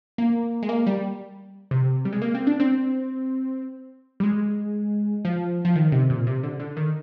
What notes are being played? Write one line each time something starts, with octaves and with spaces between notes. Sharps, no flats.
A#3
G#3
A#3
G3
C3
G3
G#3
A#3
C4
D4
C4
G3
G#3
F3
F3
D#3
C3
A#2
C3
D3
D3
D#3